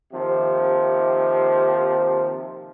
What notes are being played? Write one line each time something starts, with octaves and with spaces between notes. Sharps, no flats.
D#2 C3 F3